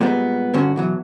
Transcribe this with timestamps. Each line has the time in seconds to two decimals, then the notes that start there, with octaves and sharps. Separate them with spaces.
0.01 A#2 G3 G#3 B3
0.54 G2 D3 C#4 F#4
0.76 B2 E3 F#3